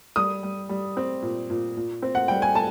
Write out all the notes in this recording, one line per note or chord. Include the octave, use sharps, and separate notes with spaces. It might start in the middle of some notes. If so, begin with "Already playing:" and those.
G3 D#6
G3
G3
C4
A#2
A#2
A#2
C4
F#5
G3 G5
G#5
A5